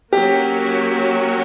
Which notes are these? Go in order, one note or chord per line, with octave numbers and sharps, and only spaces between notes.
F#3 A#3 C#4 F#4 G4